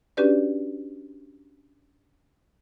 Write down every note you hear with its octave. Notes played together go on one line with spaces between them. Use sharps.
C#4 D4 F#4 G4 B4 D5